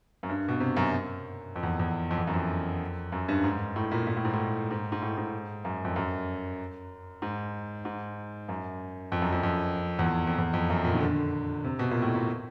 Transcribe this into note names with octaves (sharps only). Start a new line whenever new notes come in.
F#2
G2
B2
C3
F#2
F2
E2
E2
F2
E2
F#2
F2
F#2
G2
G#2
A2
A#2
A#2
A2
G#2
A2
G#2
G#2
A2
G#2
F#2
F2
F#2
G#2
G#2
F#2
F2
F#2
F2
F2
E2
F2
F2
E2
F2
F#2
A#2
D#3
D3
C3
B2
A#2
A2
A#2